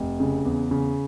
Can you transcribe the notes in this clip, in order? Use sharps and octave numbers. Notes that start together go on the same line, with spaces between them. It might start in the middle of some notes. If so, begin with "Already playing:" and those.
Already playing: F1
C#3
E2
C#3